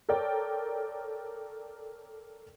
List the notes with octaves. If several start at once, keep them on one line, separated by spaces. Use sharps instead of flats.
A4 A#4 C#5 D5 G5